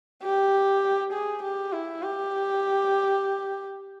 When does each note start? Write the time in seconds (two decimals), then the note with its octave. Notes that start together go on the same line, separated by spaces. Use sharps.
0.23 G4
1.13 G#4
1.43 G4
1.73 E4
2.03 G4